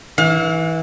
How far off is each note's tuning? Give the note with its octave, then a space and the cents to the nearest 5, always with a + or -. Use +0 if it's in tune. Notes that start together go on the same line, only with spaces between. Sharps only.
E3 -20 F5 +35